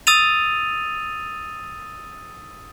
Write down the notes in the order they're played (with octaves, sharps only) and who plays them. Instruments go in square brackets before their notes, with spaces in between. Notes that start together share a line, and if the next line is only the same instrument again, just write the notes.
[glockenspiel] D#6 E6 A6 D#7 F7